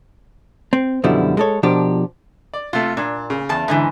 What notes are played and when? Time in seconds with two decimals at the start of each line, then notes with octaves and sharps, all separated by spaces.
0.73 C4
1.04 F#2 B2 D3 F3 G3 E4
1.37 G#3 A4 C#5
1.63 B2 F3 D4 G4 A#4
2.54 D5
2.73 C3 A3 F4
2.97 A#2 D4
3.30 C#3
3.49 E2 A5
3.68 G#2 D3 E3